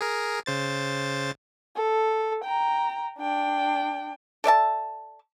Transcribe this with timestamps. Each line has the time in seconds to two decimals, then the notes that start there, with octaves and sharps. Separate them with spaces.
0.01 G#4 A#4
0.46 C#3 C5 A6
1.76 A4
2.45 G5 A#5
3.19 D4 G5
4.44 A4 D5 E5 A5